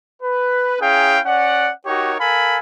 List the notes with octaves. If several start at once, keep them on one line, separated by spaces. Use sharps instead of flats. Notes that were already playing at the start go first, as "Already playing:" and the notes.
B4
C#4 E4 G#4 F5 G5
C#4 D5 F#5
D#4 F#4 G4 A#4 C#5
A4 A#4 F5 G#5 B5